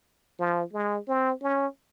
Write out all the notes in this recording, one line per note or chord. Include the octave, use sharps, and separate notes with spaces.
F3
G#3
C4
C#4